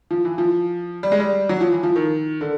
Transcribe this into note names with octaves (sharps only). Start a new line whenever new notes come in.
F3
E3
F3
G3
G#3
G3
F#3
F3
E3
F3
D#3
D3